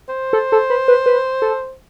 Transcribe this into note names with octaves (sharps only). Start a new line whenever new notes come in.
C5
A4
A4
B4
B4
B4
A4